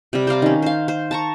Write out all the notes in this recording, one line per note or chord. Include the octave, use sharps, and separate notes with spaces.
C3 G3
C5 D5 F5 A#5
D#3 C#4
C5 F5
C5
A5 A#5 C#6